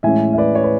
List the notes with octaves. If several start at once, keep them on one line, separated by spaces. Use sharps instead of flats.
A2 E3 G#3 C#4 E5 G#5
E5
B4 D5
C#5
B4